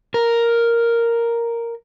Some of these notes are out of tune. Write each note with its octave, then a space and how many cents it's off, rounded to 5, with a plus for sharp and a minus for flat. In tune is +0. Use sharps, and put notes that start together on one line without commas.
A#4 +0